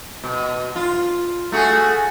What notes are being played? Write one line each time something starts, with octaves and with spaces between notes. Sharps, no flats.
B2
F4
A3 F#4 G#4